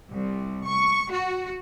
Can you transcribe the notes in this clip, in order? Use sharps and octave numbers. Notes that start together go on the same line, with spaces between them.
C2
C#6
F#4